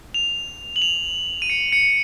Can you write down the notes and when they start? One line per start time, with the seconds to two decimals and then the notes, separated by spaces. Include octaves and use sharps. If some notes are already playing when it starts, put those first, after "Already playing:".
0.14 F7
0.76 F#7
0.82 F7
1.42 D#7
1.50 C#7
1.72 C#7